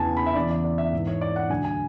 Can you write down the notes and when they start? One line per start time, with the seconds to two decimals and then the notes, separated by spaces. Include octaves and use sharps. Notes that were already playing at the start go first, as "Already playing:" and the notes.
Already playing: E2 C#3 E3 G#5 A5
0.17 B5
0.26 E5
0.36 E2 C#3 E3 D5
0.50 D5
0.64 D5
0.78 E5
0.93 G#2 E3
1.07 C#5
1.21 D5
1.36 F#5
1.50 D2 D3 F#3 G#5
1.65 G#5